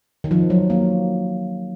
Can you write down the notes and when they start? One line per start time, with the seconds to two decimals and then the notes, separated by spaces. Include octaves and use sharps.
0.24 D#3
0.31 F3
0.50 F#3
0.70 A#3